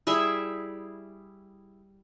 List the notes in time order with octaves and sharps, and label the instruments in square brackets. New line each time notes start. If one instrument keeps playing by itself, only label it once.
[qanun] G3 E4 G#4 E5